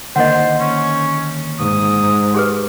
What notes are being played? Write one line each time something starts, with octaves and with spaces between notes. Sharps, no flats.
D3 D#3 A#3 C5 D#5 F#5
C#4
G#2 D#6
G4 G#4 B4